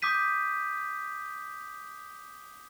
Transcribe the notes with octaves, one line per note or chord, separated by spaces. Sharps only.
D6 D#6 G6 B6 D#7